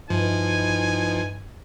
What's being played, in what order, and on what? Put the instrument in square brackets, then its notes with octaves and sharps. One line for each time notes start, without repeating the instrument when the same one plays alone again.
[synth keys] G2 [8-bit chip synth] F3 [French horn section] D#4 E4 B4 [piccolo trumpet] G#5